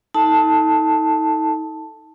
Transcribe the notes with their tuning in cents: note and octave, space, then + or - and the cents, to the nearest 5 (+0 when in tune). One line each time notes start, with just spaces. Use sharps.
D#4 +40 A4 +0 A5 +0